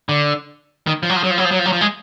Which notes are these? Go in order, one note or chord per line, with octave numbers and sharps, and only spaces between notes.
D3
D#3
F3
F#3
F3
F#3
F3
F#3
F3
F#3
F3
F#3
F3
G#3